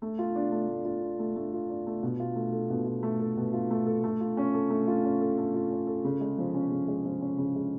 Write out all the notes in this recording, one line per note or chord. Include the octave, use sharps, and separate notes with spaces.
A3
F4
D4
A3
A3
F4
D4
A3
A3
F4
D4
A3
B2
F4
A3
A4
B2
F4
A3
A4
B2
F4
A3
A4
A3
F4
C#4
A4
A3
F4
C#4
A4
A3
F4
C#4
A4
C#3
G#3
F3
C#4
C#3
G#3
F3
C#4
C#3
G#3